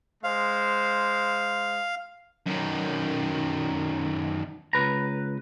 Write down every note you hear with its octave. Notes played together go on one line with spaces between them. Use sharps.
G#3 C5 F5
F#2 D#3
C#2 B4 A#5